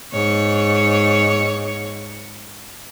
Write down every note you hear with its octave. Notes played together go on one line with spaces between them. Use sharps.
G#2 C#5